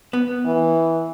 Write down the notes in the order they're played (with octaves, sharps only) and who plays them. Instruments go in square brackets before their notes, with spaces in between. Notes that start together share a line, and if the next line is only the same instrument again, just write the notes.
[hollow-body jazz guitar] B3
[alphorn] E3